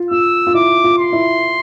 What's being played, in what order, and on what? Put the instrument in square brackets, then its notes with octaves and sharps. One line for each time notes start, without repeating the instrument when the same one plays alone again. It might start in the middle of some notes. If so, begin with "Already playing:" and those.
Already playing: [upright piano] F4
[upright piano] F4 [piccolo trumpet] E6
[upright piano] F4
[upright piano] E4 [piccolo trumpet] D6
[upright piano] F4
[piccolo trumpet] C6
[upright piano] E4